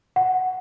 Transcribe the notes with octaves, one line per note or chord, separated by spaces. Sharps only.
F#5